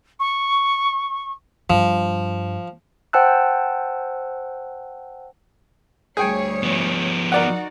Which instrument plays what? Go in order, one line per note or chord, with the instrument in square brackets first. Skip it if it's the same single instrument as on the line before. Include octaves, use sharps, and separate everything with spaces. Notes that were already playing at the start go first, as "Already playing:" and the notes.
[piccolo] C#6
[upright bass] G2 [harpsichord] F3
[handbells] C5 F#5 G5 A5 E6 F#6
[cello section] D2 G3 C#5 [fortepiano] G#4 G5 G#5
[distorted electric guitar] F3 B3
[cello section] D#4 F#4 [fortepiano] A#4 D5 F#5